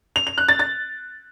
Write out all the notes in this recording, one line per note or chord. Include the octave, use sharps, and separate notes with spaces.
F7
F7
F#6
A6
A6